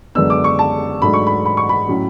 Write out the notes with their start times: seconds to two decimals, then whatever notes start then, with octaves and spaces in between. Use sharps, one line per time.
0.15 F#2 D3 G#3 B3 D4 E6
0.30 D6
0.44 C#6
0.59 A5
1.02 G#2 F#3 A3 D4 B5
1.13 C#6
1.27 B5
1.46 B5
1.57 C#6
1.69 B5
1.88 A2 F#3 C#4